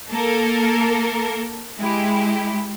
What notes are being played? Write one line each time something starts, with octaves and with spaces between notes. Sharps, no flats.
A#3 A4 A#4
G#3 E4 G4